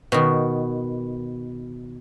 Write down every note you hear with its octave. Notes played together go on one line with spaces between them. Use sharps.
B2 D#3